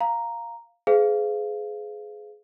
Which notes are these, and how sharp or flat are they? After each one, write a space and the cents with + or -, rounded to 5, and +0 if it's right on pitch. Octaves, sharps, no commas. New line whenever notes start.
F5 +0 A#5 +0
G#4 +20 C5 -45 F5 -15